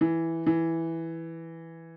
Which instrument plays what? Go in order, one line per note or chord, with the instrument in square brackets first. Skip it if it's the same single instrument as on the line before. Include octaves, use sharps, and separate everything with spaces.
[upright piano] E3
E3